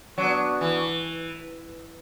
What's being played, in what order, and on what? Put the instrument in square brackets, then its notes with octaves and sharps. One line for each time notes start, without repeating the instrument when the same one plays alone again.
[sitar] F#3 [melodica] B3 D4 F#4
[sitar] E3